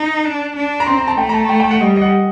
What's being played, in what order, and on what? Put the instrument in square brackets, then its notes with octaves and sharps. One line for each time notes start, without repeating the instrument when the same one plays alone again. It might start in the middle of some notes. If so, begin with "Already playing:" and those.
Already playing: [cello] D#4
D4
D4
[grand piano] A#5
[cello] C4 [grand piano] C6
[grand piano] A#5
A5
[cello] A3 [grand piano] G5
[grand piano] A#5
A5
G5
G5
F#5
[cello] G3 [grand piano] D#5
[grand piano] D#5
F#5